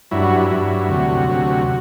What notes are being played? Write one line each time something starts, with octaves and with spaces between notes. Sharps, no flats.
G2 F#3 E4
F#4
E4
G2 F#3
D2 C3 F#3 F#4
D2 C3 F#3